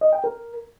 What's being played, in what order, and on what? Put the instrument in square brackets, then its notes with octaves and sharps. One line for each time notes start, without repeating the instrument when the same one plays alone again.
[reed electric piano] D#5
G5
A#4